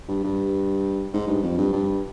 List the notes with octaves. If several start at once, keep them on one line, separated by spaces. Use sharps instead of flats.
G2
G2
G#2
G2
F2
G2
G2